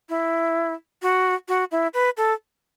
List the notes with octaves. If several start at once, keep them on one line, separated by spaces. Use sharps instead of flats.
E4
F#4
F#4
E4
B4
A4